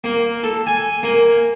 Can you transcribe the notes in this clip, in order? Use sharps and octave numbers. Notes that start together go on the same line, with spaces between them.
A#3
A4
G#5
A#3